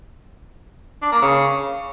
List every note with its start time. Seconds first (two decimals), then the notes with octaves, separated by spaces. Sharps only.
1.02 D4
1.12 A#3
1.22 C#3